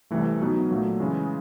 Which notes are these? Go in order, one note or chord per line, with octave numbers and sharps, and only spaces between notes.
C2 C3 E3 A3
B2 F#3 B3 D#4
A#2 F#3 A3
C#3 E3 G#3 C#4